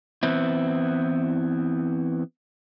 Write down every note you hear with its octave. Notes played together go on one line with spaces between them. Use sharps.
E3 B3 C4 E4